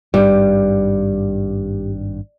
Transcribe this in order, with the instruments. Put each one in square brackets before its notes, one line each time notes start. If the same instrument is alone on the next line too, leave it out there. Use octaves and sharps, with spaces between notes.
[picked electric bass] G#1 G2 [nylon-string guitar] G3